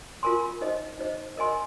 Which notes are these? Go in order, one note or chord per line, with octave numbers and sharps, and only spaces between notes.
F4 A#4 G#5 C6
D#4 C5 D#5
D#4 C5 D#5
A#4 D#5 G#5 C6